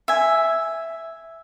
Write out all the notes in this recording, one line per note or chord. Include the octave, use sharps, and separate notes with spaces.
E5 G#5